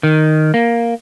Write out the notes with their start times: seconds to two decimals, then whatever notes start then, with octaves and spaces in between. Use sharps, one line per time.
0.03 D#3
0.54 A#3